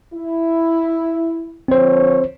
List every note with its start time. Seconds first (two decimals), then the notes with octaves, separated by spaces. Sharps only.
0.14 E4
1.68 D3 F3 C4 C5 C#5